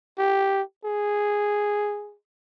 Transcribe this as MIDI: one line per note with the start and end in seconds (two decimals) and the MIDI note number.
0.18 0.62 67
0.85 2.16 68